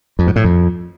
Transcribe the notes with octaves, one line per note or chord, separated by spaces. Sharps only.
F2
G#2
A2
F2